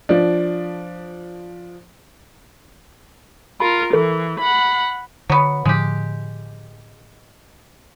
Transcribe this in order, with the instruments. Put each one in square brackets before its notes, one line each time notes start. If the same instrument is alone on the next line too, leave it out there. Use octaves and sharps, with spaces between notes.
[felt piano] F3 D4
[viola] F4 A#4 [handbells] B5
[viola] E3 [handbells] A4 A#4
[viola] F#5 B5
[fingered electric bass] D3 [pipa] F#3 B3
[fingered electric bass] A2 D3 F3 [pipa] G#3 G4